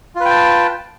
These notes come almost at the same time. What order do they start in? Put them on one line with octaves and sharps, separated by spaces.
F4 B4 G5 A5